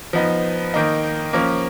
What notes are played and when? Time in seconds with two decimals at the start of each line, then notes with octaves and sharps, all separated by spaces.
0.13 F3 B3 D#4
0.74 D#3 A#3 D#4
1.33 F3 A#3 C#4